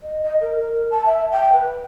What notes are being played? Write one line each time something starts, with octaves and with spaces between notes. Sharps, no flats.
D#5
D#5
A#4
A#4
A5
E5
G5
B4